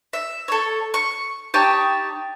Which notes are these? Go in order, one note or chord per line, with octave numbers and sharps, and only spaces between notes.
E5
A4 C#5
C#6
D#4 G4 C#5 A5